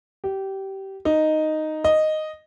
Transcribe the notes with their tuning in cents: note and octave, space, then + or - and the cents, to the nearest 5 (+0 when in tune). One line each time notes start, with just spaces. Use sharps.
G4 -20
D#4 -5
D#5 -5